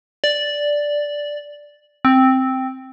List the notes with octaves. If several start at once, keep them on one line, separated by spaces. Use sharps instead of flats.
D5
C4